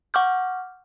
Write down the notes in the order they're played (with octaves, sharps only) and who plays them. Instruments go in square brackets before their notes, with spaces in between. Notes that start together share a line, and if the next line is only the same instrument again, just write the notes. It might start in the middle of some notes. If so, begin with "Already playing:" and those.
[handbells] F#5 C#6 D6 F6 G6